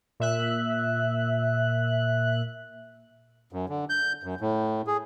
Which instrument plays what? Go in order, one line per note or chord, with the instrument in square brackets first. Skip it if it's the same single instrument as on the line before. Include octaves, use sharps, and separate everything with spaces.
[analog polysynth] A#2 E5 F#6
[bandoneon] F#2
D3
G6
F#2
A2
G#4